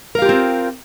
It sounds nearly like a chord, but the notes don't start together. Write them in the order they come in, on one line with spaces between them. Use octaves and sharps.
A#4 F5 G4 F4 C4